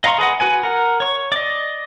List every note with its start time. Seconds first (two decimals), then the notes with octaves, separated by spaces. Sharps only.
0.04 D#5 F5 A#5 C6 C#6
0.18 G#4 B4 D#5 F#5
0.40 F#4 B4 G#5
0.63 A#4 F#5
1.00 C#5 C#6
1.32 D5 D#5